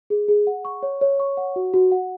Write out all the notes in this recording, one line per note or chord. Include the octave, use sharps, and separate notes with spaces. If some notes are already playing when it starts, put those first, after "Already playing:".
G#4
G#4
F#5
C#6
C#5
C#5
C#6
F#5
F#4
F#4
F#5